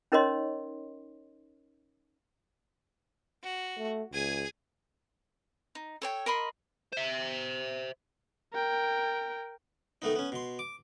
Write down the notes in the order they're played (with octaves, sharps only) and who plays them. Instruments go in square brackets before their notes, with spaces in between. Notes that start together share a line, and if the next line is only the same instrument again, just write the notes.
[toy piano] C#4 D#4 A#4 C#5 D#5 C6
[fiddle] F#4
[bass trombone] A3
[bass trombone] C#2 [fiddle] G#4 G#5
[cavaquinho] D#4
A4 C#5 G5
A#4 D#5 B5 C6
[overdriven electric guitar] C5 E5
[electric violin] A#4 G5
[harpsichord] D#3 A3 B3 D#4
B3 C#4
B2 C6
D6